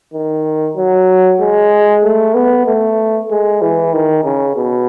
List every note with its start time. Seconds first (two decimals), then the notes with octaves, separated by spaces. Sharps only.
0.13 D#3
0.77 F#3
1.40 G#3
2.03 A3
2.35 B3
2.67 A3
3.30 G#3
3.62 E3
3.93 D#3
4.24 C#3
4.56 B2